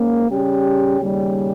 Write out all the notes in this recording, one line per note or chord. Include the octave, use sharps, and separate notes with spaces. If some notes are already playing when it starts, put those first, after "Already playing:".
Already playing: G#2 A#3 C#4
C#3 G3 C#4 G4
D#2 C#3 G3